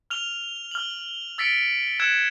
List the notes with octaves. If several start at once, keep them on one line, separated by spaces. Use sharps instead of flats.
F6 F7 G7
F6 F#7
E6 A6 B6 C#7 D7
E6 F#6 G#6 C#7 E7